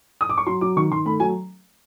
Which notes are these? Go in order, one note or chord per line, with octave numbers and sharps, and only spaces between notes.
D#6
D6
C#6
F#3 C6
F#3 D6
D#3 C#6
D#3 C6
A3 B5
F#3 G#5